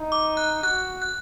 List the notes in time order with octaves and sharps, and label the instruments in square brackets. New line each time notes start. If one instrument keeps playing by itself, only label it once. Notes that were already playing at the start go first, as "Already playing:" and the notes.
Already playing: [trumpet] D#4
[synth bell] D6
F#6
[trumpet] F#4 [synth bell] F#6
[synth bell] F#6